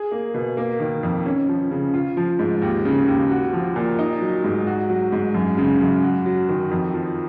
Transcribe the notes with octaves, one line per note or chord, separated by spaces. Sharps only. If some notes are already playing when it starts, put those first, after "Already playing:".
Already playing: G#4
A#3
B2
A#3
D#3
F2
C#4
F3
C#3
F4
F3
G#2
D#2
C#3
D#2
F#4
F3
A#2
D#4
F#3
G#2
F#4
F#3
G#2
F#2
C#3
F#2
F#4
F#3
D#3
F2
F3